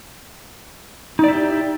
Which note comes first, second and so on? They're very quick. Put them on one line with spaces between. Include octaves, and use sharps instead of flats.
D#4 D5 E4 G4